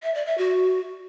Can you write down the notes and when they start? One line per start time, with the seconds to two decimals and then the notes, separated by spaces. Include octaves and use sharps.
0.03 E5
0.15 D5
0.26 E5
0.38 F#4